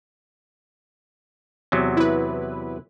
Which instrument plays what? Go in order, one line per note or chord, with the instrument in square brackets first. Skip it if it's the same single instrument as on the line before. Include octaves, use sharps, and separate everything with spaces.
[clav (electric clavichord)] E2 C3 F#3
[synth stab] E4 B4